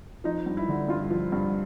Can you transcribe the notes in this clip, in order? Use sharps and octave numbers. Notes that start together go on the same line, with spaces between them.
F3 D#4
G2
E4
D3
G2 F4
F3
G2